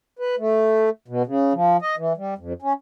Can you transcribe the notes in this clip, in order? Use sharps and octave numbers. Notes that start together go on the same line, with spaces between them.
B4
A3
B2
C#3
F3
D#5
E3
G3
F2
C#4